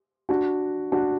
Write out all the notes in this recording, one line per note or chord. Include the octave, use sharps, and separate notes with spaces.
D4 F#4
D4 F#4